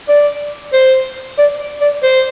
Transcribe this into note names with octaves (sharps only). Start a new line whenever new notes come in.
D5
C5
D5
D5
C5